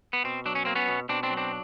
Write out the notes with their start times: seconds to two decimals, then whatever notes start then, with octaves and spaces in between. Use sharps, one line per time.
0.13 B3
0.24 B2 C4
0.46 F#3 D4
0.55 C#4
0.65 A#3 C4
0.75 B3 C#4
0.88 B2
1.09 B2 C4 D4
1.23 C4 D4
1.30 F#3
1.37 C4 D4